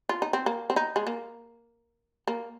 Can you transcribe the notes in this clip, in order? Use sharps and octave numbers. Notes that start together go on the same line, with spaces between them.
F4
D#4
C4
A#3
C4
D#4
G#3
A#3
A#3